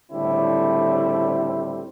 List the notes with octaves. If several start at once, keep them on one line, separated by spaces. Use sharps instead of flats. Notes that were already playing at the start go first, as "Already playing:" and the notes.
C#2 A2 D3 G3 C4 E4